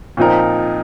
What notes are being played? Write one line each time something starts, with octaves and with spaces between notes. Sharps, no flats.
A#2 F3 C4 D#4 A#4